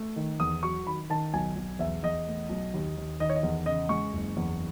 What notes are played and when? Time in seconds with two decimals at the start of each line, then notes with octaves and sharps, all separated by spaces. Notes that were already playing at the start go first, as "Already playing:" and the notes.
Already playing: A3
0.16 D#3
0.40 E2 D#6
0.63 F#3 C#6
0.87 D#3 B5
1.10 D#3 A5
1.34 B1 G#5
1.56 B1
1.79 E2 E5
2.03 E2 D#5
2.27 A3
2.50 B1
2.74 D#2
2.97 D#2
3.20 D#3 D#5
3.30 C#5
3.36 D#5
3.43 E2
3.66 C#3 D#5
3.89 G#3 C#6
4.13 F#1
4.37 E2